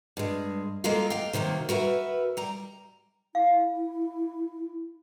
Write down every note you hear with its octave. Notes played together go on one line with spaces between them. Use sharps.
G2 G#3
G#3 A#3 F4 A4 A#4 F5
G4 F5
C3 D#3 F#3 A#3
F#4 A#4 B4 E5
G3 A#5
E4 F5